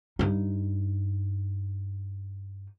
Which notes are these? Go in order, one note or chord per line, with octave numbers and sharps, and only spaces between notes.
G2 D#4